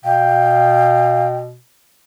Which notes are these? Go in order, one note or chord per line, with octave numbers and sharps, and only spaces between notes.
B2 F5 G5